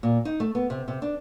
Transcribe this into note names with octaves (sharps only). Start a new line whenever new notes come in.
A#2
D#4
A3
B3
C3
C3
D4